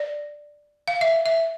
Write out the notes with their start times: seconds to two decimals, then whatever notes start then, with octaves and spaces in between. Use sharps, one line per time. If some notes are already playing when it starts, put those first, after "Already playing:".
Already playing: D5
0.88 F5
1.01 E5
1.26 E5